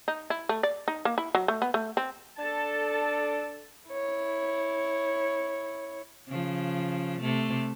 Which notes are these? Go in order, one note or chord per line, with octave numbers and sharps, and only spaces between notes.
D#4
E4
A3
D5
D#4
A#3
E4
F#3
A3
B3
A3
C4
D4 A4 A5
E4 C#5
C#3 F3
C3 A3